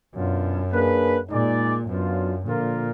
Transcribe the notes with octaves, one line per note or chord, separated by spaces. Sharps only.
F#2 B2 F#3 D4 F4
A#3 D4 G#4 B4
A#2 G#3 D#4 G#4 D5
F#2 F#3 B3 D4 F4
A#2 D3 F3 A#3 F4 A#4